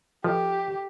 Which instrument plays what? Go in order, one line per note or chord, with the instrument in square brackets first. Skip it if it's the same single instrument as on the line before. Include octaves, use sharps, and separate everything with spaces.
[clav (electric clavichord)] F3 [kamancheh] G4 [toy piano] A4 B4 D#5